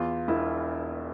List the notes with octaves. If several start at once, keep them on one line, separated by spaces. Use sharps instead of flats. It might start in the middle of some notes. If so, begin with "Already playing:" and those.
Already playing: E2 F4
E1 E4